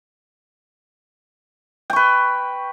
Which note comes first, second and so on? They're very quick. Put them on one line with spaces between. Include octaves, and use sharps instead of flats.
G5 C#6 B4